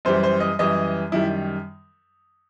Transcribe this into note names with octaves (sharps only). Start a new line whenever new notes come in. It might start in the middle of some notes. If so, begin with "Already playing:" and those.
F#2 E3 G3 C5
C5
D#5
F#2 E3 G3 D#5
F#2 D#3 G3 E4